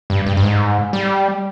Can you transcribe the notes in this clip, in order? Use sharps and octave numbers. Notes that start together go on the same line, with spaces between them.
G2
G2
G2
G#2
G3